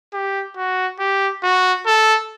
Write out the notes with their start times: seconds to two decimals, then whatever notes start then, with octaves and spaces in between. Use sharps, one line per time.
0.14 G4
0.57 F#4
1.00 G4
1.43 F#4
1.87 A4